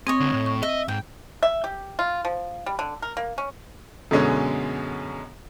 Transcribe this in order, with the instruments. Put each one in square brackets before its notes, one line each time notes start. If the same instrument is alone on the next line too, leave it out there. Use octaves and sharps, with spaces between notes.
[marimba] C4 [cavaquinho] C#5 D#5 G#5
[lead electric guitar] C#2 D3
A2
[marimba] C#6
[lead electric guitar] D#5 [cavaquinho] E5
[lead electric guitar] G#2 [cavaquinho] G5
[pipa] E5
G4
F4
F3
G3
D3
A#4
A#3
C#4
[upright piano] F#2 B2 D3 G#3 C#4